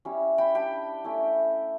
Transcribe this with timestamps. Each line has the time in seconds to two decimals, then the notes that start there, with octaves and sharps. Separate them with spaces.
0.05 G3 C#4 E4
0.38 G5 B5
0.55 G3 D4 G5 B5
1.04 A3 C#4 E4